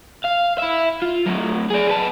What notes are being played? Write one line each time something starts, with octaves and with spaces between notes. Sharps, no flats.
F5
E4 E5
F4
A2 F#3
G#4 D5
B3 A5